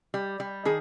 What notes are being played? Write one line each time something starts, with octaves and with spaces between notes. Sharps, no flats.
G3
G3
D#3 G#4